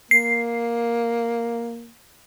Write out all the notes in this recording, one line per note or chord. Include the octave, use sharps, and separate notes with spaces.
A#3 C7